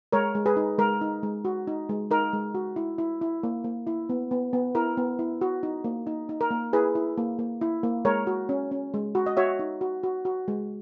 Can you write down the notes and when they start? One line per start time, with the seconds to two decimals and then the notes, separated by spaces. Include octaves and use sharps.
0.12 G#3 A#4 C#5
0.35 G#3
0.46 G#4 B4
0.56 D#4
0.78 G#3 A#4
1.01 D#4
1.23 G#3
1.45 F#4
1.67 D#4
1.89 G#3
2.11 D#4 A#4
2.33 G#3
2.55 F#4
2.76 E4
2.98 E4
3.22 E4
3.43 A#3
3.64 A#3
3.87 E4
4.09 B3
4.31 B3
4.53 B3
4.75 E4 A#4
4.97 B3
5.19 E4
5.41 F#4
5.63 D#4
5.84 A#3
6.07 D#4
6.29 D#4
6.41 A#4
6.51 A#3
6.73 E4 G#4 B4
6.95 E4
7.17 A#3
7.39 A#3
7.61 E4
7.83 A#3
8.05 G#3 A#4 C#5
8.27 F#4
8.49 C#4
8.71 C#4
8.94 G#3
9.15 F#4
9.26 D#5
9.37 F#4 C#5 E5
9.59 D#4
9.81 F#4
10.03 F#4
10.25 F#4
10.48 G#3